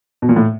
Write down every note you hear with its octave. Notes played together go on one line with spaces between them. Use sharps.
B2
A#2
A2